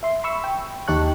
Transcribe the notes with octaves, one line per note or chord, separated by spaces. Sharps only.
E5 C6
B5 C#6 E6
G5
D#2 D#4 G4 A5 C#6 F#6